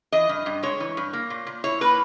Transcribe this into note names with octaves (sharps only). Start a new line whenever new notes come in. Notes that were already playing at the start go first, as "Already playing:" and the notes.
E3 D#5
G2
G2
G#3 C#5
E3
G2
A#3
A#2
A#2
E4 C#5
A#3 B4